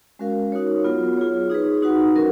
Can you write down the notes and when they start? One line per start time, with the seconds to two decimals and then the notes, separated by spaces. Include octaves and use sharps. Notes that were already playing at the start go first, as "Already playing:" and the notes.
0.19 G#3 C#4 F#4 A#4 F5
0.52 D#4 F#4 A#4 C#5
0.84 F#3 B3 F4
1.17 F4 G#4 C#5
1.50 D#4 G#4 B4
1.82 D#4 F#4 B4 F#5
2.15 F#3 C#4 F#4 A#4